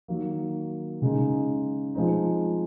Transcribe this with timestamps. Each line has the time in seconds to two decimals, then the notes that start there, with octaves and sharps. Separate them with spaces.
0.08 D#3 F#3 A#3
1.02 C#3 G#3 D#4
1.95 F3 G#3 C4 D#4